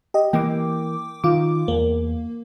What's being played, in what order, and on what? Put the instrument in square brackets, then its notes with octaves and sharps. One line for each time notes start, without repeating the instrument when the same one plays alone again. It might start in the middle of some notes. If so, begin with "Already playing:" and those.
[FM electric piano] G4 D#5
[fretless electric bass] E3 A#3 [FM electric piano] G5 D6
[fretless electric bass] D#3 [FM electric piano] F4 D6
[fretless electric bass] E2 [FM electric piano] A#3